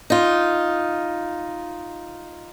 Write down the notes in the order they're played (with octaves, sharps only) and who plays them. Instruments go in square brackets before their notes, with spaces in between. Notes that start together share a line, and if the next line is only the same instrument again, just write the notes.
[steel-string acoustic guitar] D#4 F4